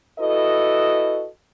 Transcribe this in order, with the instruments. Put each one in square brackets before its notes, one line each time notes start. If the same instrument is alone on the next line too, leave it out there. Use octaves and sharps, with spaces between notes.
[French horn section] E4 F#4 A4 B4 D#5